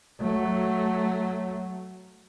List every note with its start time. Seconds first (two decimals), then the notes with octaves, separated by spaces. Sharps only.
0.21 F#3 A3